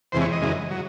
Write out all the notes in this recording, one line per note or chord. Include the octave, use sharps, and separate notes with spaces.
E2 C3 E3 G#3 C5
C#5
D#5
F#2 C#3 E3 G#3
F#3